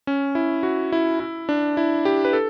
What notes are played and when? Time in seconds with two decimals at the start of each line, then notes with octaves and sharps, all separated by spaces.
0.07 C#4
0.35 E4
0.63 F#4
0.92 E4
1.20 E4
1.49 D4
1.77 E4
2.05 G4
2.25 B4
2.33 A4